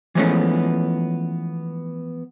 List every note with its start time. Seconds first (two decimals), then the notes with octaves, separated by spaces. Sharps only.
0.15 E3 F3 G#3 A3 B3 C#4